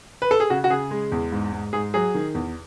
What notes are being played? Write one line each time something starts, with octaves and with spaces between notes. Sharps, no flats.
B4
A4
G#4
C#3 F#4
F#4
C#3 G#4
G#3
E2
G#2
G#2
G#2 G#4
F#3 G#4
D#3
E2